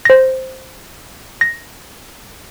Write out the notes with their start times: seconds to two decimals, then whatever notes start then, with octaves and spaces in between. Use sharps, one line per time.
0.05 C5 A#6
1.41 A#6